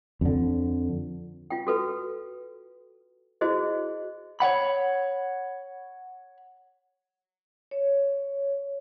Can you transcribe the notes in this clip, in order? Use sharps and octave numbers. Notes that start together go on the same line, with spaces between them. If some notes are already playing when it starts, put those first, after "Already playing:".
F2 D3
F4 G5
F#4 A4 B4
E4 F#4 G#4 C5 D#5
C#5 D5 F#5 B5
C#5